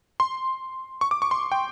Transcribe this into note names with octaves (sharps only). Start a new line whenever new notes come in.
C6
C#6
D6
C#6
C6
G5